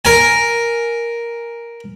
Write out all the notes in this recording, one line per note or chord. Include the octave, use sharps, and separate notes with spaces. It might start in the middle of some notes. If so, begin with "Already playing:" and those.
A#4 G#5